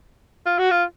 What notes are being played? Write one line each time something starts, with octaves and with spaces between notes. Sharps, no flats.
F4
F#4
F4